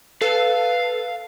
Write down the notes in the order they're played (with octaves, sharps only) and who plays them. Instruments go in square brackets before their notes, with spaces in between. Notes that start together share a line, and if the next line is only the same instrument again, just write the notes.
[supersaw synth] A4 [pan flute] B4 [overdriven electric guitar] F5